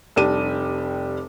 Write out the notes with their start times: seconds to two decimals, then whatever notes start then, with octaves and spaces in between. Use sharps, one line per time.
0.16 F1 G3 D4 G4 D#7